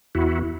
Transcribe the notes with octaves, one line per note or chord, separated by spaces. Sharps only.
E2 E4 F#4